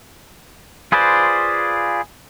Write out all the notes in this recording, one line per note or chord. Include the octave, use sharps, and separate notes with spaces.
F4 G#4 B4 C5 D5